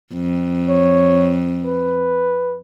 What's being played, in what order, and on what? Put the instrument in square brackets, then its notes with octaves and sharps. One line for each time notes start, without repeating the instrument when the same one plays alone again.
[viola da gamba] F2
[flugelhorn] C#5
B4